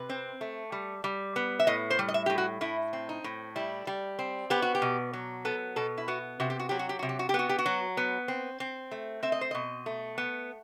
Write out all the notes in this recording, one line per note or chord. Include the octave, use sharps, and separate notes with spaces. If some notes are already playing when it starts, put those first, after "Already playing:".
Already playing: C3 B4
C4
A3
G3
G3
B3
E5
A2 D#5
C5
G3
D#5
E5
A2 G4
F#4
A2 E4
C4
D#4
A2
G3 E4
G3
C4
B3 G4
F#4
G4
B2
F#3
B3 A4
B2 A4
E4
B3 F#4
C3 F#4
G4
F#4
F#3 G4
F#4
G4
C3 F#4
G4
F#4
G4
B3 F#4
G4
F#4
F#3
B3
C4
C4
A3
C4 E5
D#5
C5
B2 D#5
A3
B3